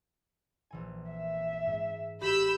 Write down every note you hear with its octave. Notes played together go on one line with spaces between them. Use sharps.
A#1 E3 G#5
E5
G#2
A1 F#4 G4 B5 E6 G6